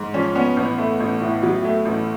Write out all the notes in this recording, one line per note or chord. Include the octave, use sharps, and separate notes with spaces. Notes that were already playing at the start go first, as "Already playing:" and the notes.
Already playing: G#2
F3 C#4
B3 C#4
A1 B3
A3
A1
A2
F#3
A3
A1